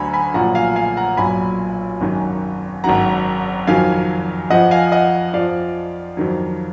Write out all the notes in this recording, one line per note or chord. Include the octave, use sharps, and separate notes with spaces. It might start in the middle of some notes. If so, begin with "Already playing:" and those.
Already playing: D2 D3 F#3 G#5 A#5 B5
G#5 B5
B1 A#2 F3 F#5 A#5
F5 G#5
F5 G#5
F#5 A#5
B1 A#2 F#3 G#5 B5
G#1 F#2 D#3
G#1 F#2 D#3 F#3 F#5 A#5
F2 D#3 F#3 F5 G#5
F2 F3 D#5 F#5
F5 G#5
D#5 F#5
F2 F3 D5 F5
F2 D#3 F#3